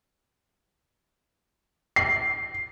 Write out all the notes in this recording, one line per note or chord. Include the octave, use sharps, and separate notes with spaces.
C7